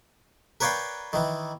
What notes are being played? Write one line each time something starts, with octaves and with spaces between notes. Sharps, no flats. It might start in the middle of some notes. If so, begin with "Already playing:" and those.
A#4 B4 C#5 D5 F5 G5
D#3 E3